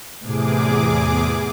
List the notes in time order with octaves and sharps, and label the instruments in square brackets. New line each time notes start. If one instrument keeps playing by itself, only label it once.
[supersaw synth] E2 G#4 D6 [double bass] A2 C3